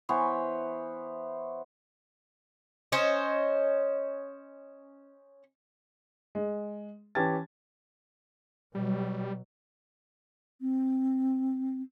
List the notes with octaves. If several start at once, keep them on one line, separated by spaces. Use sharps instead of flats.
E3 B3 C5 C#5
C#4 C5 C#5 D#5
G#3
E3 C#4 G4 A5 G#6 A6
B2 F#3 G3
C4